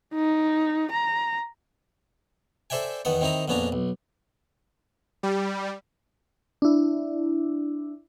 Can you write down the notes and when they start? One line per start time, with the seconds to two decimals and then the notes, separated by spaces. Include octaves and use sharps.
0.14 D#4
0.92 A#5
2.70 A4 C5 D5 E5 G5 G#5
3.05 E2 D#3 B3 F#5
3.21 D#3 C4 E4 D#5 A#5
3.48 A#1 F2 B3 C#4 D4 A#5
3.72 B1
5.23 G3
6.62 D4 E4